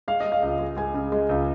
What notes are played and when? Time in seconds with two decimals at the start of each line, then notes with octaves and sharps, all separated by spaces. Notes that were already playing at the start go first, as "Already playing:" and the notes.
0.08 G#3 F5
0.20 G#3 D#5
0.32 F5
0.42 C#2
0.59 G#3
0.77 G#3 G#5
0.94 C#3
1.12 G#3
1.29 C#2